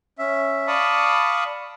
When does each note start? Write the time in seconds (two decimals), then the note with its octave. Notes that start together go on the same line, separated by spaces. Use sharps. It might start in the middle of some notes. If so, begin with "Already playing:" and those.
0.19 C#4 E5
0.67 D5 F5 A5 B5 C#6 D#6